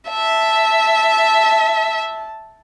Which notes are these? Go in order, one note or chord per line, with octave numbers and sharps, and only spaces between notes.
E5 A5